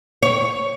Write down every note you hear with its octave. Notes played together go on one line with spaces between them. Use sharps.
C#5